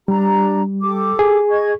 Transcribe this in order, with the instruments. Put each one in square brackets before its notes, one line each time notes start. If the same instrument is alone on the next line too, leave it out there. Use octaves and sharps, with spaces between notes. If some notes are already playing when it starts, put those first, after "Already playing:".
[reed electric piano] G3 [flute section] D4 G4 A#5
[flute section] G4 A4 D6
[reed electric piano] G#4
[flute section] D#5 C#6 G#6